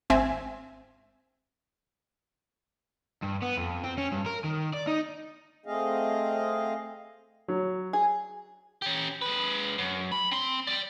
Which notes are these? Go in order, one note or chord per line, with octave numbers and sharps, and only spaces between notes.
G#1 C4 E5 G#5
G2
B3
F2
C4
C#4
G2
A#4
D#3
D5
D#4
A3 C4 G#4 D#5 F5
F#3
G#4
C#4 G4
G#3 B4
F#2
B5
C4 C6
D5 G5